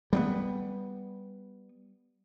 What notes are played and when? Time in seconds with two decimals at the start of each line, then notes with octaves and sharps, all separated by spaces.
0.13 G3 A#3 B3